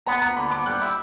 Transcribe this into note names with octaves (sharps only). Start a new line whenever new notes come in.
B3 A#5
B3 A#5
D3 B5
B3 D6
G3 F#6
E4